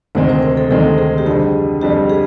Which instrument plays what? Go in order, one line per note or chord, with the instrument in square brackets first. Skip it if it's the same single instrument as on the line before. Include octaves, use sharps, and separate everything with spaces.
[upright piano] D2 C3 D#3 G#3 C4 [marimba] C5
[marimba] C5
A#4
A4
[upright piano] D2 C3 D#3 G#3 C4 [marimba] A4
[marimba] G#4
G4
[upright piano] F2 D3 G3 [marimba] G#4
[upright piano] F2 D3 G3 [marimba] G4
[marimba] G#4